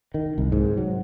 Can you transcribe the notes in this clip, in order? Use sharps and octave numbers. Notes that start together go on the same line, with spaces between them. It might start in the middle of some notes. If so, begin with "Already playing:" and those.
D#3
C2
G#2
F#3